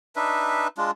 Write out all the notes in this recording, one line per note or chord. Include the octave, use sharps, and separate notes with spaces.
D4 D#4 B4 E5
G#3 D4 F4